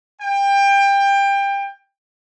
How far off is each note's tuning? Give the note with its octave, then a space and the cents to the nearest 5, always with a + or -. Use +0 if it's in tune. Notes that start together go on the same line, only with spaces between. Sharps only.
G5 +25